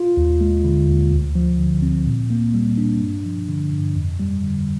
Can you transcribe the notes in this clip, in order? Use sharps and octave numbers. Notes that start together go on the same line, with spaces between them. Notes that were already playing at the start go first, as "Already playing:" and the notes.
Already playing: F4
D#2
G#3
D3
D#2
D2
F3
D3
C4
A#2
A#3
G3
D4
G2
F3
D3
G2
F2
G3
D3